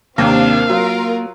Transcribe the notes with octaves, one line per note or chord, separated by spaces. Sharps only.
D#2 C3 A#3 C4 D4 F5
F#3 F4 A#4